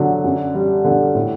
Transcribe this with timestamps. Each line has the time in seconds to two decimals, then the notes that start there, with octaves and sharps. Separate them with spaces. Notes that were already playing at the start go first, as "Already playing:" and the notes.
Already playing: D3 F#3
0.24 F#2
0.54 G3
0.84 D3
1.15 A2